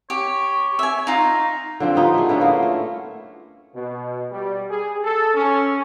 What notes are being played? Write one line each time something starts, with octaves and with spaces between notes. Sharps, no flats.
G4 C#5
E5 G#5
D#4 F4
D3 F3 C4
G3 B3 D#4 F4
A3 G#4
D3 B3 C#4 A4
A#3 E4 F4
A3
B2
G3
G#4
A4
C#4